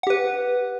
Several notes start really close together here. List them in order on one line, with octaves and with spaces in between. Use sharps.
F#5 G4 B4